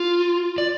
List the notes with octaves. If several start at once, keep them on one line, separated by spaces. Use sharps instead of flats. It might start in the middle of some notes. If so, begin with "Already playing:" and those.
Already playing: F4
D5